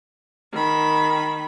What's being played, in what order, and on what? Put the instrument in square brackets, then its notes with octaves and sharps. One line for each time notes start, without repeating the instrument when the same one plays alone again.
[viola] D#3 B5